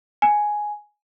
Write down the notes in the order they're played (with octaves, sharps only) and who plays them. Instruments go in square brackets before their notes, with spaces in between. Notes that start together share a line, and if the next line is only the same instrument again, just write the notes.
[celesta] G#5